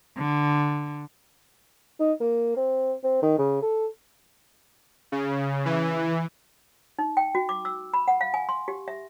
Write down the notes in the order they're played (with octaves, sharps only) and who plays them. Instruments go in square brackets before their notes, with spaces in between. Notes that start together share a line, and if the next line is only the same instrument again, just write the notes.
[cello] D3
[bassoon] D#4
A#3
C4
C4
D#3
C#3
A4
[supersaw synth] C#3
E3
[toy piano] D#4
G5
F#4
D6
E6
B5
F#5
F5
G#5
C6
G4
E5